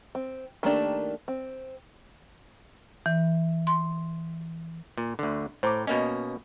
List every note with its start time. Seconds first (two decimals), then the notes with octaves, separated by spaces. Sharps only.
0.15 C4
0.63 D#3 A3 A#3 D4 G4
1.28 C4
3.06 E3
3.67 C6
4.98 A#2
5.19 D2 D3
5.63 A2 C5 A#5 D6
5.87 B2 A#3 C#4 D#5